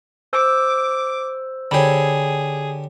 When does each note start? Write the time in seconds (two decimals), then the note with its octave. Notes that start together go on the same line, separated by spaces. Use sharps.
0.33 C5 D6 E6
1.71 D3 G4 G#4 C#5 B5